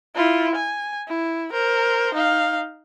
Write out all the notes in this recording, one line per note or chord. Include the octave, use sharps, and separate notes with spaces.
E4 F4
G#5
E4
A#4 C5
D#4 F5